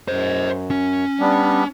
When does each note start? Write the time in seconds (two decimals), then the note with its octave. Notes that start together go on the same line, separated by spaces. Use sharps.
0.08 F#2 C5 D#5
0.71 C#4
1.20 G3 B3 D4